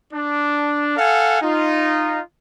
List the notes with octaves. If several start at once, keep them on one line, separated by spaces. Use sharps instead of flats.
D4
A4 F5 F#5 G#5
D#4 F4